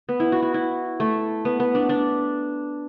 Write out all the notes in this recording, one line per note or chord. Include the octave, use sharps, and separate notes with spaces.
B3
E4
F#4
F#4
E4
A3
B3
B3
D4
D4